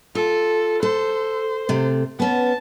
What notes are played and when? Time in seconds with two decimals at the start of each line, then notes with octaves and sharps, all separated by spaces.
0.15 F4 A4
0.83 A4 C5
1.69 C3 A3
2.20 B3 C#4 A5